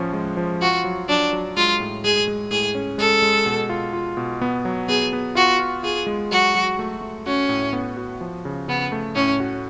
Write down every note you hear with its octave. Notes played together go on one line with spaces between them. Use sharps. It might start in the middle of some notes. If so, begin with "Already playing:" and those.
Already playing: A2 F3 C#4
G#3
F3
F4 F#4
F#3
F#3 D4
F#3
G#3 F4
A2
G#3 G#4
G#3
A2 G#4
C#4
G#3 A4
G#3
B2
F4
F4
B2
B3
F#3
B3 G#4
B3
F4 F#4
F4
F4 G#4
G#3
F#3 F#4
F#3
A3
A3
C#4 F#4
A2
B3
F#4
F3
C#3
C#3 B3
A3
A2 C#4
F#4